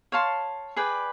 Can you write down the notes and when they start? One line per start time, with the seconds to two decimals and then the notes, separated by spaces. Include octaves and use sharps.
0.12 C#5 F5 A5 C6
0.76 G#4 B4 D5 G5